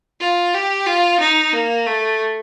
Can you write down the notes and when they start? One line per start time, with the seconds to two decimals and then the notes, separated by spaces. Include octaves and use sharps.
0.20 F4
0.54 G4
0.87 F4
1.20 D#4
1.53 A#3
1.86 A3